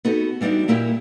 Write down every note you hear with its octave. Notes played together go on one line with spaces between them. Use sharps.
B3 D#4 F#4 G4 A4
E3 G3 D4 D#4 F#4
A#2 A#3 E4 G4 A#4 G5